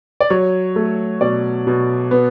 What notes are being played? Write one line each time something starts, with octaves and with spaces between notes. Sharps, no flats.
D5
F#3 C#5
A3
B2 D5
B2
B3